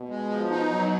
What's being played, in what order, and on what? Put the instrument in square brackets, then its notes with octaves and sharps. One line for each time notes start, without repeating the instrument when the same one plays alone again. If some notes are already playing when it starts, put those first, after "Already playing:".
Already playing: [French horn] B2
[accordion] G#3
F3
D#4
F#3